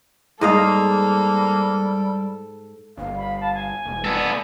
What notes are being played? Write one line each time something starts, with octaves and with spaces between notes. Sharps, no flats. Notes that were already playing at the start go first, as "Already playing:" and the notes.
G#2 G3 A#3 A4 D#5 F5
G1 F5
B5
A5
G#5
E1
B3 A4 D5